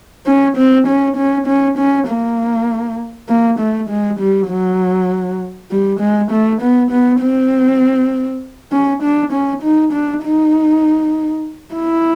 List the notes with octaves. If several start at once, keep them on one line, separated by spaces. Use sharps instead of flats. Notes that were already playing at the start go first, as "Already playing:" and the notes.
C#4
C4
C#4
C#4
C#4
C#4
A#3
A#3
A3
G#3
G3
F#3
G3
G#3
A3
B3
B3
C4
C#4
D4
C#4
D#4
D4
D#4
E4